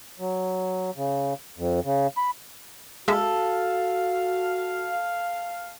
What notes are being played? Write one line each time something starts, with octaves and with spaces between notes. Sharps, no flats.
F#3
C#3
F2
C#3
B5
G#3 F#4 A4 E5 F5